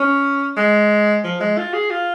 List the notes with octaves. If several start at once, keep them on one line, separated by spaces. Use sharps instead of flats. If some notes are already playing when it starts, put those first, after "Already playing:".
Already playing: C#4
G#3
F3
G#3
F4
G#4
F4